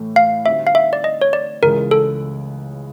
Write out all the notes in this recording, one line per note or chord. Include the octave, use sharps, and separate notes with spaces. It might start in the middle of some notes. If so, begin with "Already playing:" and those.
Already playing: A2 E3 A3
F5
D3 G3 C4 D#4 F#4 E5
F5
E5
D5
D#5
C#5
D5
C#2 C#3 E3 G#3 A#4
A4